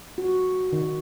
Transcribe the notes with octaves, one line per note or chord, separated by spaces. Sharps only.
F#4
D#3